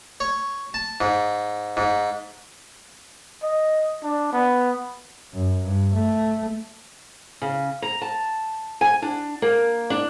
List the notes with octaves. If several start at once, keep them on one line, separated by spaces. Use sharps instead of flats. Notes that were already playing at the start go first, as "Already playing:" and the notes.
C#5
A5
G#2
G#2
D#5
D4
B3
F#2
G2
A3
C#3
A#5
A5
G#5
D4
A#3
D4